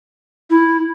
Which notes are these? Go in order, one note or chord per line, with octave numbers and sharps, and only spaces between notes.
E4